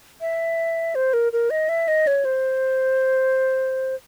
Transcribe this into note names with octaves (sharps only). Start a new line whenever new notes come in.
E5
C5
A#4
A#4
D#5
E5
D#5
C#5
C5